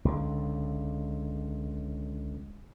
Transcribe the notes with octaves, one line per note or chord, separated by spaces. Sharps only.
C#2 D3